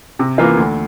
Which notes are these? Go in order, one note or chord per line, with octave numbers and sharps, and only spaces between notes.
C3
E3 A#3 F4
D2